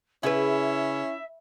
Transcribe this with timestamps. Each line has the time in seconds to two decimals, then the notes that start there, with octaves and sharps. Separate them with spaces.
0.23 C#3 C#4 E4 G#4 B4 E5